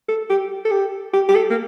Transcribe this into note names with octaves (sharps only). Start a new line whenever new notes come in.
A4
G4
A4
G4
G4
G4
A4
A#3